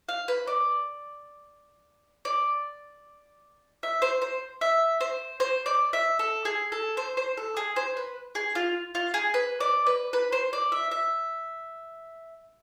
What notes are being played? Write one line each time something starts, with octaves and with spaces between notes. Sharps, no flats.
F5
B4
D5
D5
E5
C5
C5
E5
C5
C5
D5
E5
A4
G#4
A4
C5
C5
A4
G#4
C5
B4
G#4
F4
F4
G#4
B4
D5
B4
B4
C5
D5
E5
E5